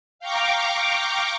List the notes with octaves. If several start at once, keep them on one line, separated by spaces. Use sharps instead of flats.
F5 G5 A#5 C#6 D6